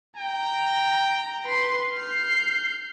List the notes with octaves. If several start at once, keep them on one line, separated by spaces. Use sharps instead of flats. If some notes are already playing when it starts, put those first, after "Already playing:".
G5 A#5
B4 C6
F6 G6 C7